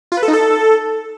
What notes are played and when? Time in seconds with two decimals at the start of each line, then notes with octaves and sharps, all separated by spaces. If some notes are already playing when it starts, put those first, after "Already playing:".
0.12 F4
0.17 B4
0.22 A4
0.28 D#4
0.33 A4